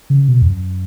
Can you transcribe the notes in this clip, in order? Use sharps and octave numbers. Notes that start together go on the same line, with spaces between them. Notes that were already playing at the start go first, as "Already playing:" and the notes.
C#3
B2
E2
F#2